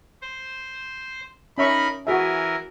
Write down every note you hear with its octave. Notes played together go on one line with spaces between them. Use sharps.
C5
C#4 D#4 A#4 E5 B5 C#6
E3 F#4 G#4 A#4 E5 G#5